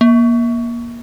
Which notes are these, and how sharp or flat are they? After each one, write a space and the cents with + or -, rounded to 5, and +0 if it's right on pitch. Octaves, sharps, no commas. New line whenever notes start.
A#3 +25